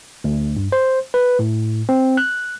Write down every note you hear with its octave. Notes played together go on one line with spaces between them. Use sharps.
D2
G2
C5
B4
A2
C4
F#6